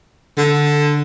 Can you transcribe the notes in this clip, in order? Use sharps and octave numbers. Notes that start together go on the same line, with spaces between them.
D3